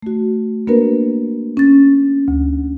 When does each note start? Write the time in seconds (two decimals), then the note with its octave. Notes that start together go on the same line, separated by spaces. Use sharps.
0.03 A3 F#4
0.67 A#3 B3 D4 F#4 A#4 B4
1.57 C#4 A6
2.28 D2